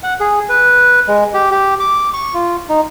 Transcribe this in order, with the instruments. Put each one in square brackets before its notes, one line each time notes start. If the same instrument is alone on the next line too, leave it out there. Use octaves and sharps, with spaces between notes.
[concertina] F#5
G#4
B4
G#3
G4
G4
D6
C#6
F4
D#4